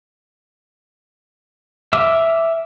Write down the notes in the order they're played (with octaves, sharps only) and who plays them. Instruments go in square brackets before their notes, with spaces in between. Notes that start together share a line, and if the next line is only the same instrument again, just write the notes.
[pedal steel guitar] E5 D6 E6 F6